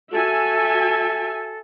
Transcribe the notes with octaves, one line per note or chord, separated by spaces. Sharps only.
F#4 A4 E5 G#5